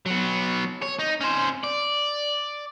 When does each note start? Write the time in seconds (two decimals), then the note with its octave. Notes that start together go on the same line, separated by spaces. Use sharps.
0.06 F#3 B3
0.82 C#5
0.99 D#4
1.21 C#4 C5
1.63 D5